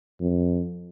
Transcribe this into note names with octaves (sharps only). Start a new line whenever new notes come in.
F2